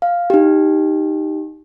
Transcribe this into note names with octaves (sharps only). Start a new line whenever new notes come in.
F5
D#4 G4